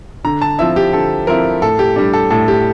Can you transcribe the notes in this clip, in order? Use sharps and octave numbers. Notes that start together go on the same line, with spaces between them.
D3 A#5
A5
F3 C4 E4 E5
G4
D3 A4
F3 C4 E4 A#4
A2 A4
G4
G3 D4
A4
A2 A4
G4